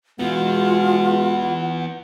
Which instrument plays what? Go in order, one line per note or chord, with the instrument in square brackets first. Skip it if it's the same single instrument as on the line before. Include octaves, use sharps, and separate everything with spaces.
[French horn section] B2 G#3 F#4 [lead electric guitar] E3 B3 [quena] F4 [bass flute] F#5